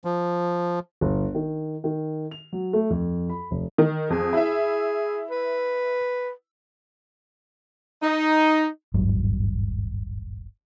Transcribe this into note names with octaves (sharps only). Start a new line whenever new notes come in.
F3
G1
D#3
D#3
F7
F#3
A3
F2
B5
F1
D#3
F2 G#4
E4 E5
B4
D#4
D#1 G#1 G2 F#3